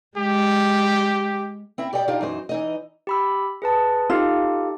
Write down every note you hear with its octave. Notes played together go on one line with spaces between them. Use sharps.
G#3 G4
C4 E4 E5
G4 D5 D#5 G5
D4 D#4 F4 G4 F5
F#2 E3 D#4 C5
E3 D#4 D#5
G4 B5 E6
G#4 B4 A5
D#4 F4 G4 A4